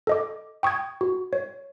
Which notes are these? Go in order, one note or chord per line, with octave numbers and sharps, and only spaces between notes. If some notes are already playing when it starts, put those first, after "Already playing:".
A4 D#5 D6
G5 C#6 D#6 G#6
F#4
C#5